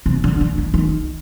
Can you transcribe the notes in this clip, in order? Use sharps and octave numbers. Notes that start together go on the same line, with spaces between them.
C3
D3
D3
D#3
D#3